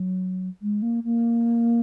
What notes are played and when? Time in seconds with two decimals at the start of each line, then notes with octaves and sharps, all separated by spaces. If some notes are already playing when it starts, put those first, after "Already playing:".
Already playing: F#3
0.62 G#3
0.82 A#3
1.04 A#3